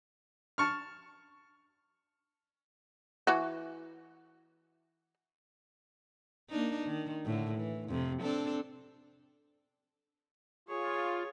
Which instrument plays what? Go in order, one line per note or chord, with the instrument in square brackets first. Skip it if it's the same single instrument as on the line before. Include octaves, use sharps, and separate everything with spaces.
[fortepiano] A5 C#6 F6
[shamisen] E3 F#4
[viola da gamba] A#3 D4 D#4
D#3
A2 D3
E3
F2 C3
C4 D4 A4
[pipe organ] F4 [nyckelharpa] G#4 C#5